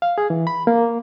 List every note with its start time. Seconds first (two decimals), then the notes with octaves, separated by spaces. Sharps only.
0.02 F5
0.18 G#4
0.30 E3
0.47 B5
0.67 A#3